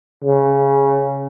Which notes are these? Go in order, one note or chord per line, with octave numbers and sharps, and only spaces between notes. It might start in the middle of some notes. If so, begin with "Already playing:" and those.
C#3